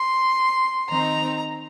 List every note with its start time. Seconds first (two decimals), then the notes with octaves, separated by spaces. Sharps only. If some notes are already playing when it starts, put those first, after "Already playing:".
Already playing: C6
0.90 D#3 C4 D#4 A#5